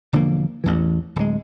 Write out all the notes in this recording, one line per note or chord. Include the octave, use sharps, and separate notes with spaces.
E1 D3 F3 A#3
A1 E2 E3
D1 G#3